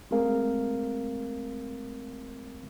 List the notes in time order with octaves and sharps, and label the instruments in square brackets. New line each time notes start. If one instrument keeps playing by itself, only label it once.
[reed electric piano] G#3 A3 C4 G#4 A#4 F5